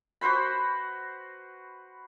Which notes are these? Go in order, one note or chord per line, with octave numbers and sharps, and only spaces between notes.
F#4 B4 C5 B5